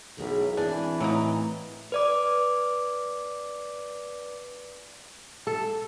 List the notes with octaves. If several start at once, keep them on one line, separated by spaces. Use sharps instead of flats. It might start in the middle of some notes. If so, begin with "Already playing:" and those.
B1 E4 G#4 A#4
E3 C4 D4 D5 G#5
A2 F#3 A#3 D#4
B4 D5 D6
A4